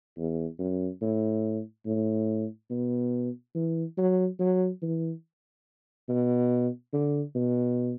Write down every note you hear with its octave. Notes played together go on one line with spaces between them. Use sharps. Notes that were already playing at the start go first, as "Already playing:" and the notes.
E2
F#2
A2
A2
B2
E3
F#3
F#3
E3
B2
D3
B2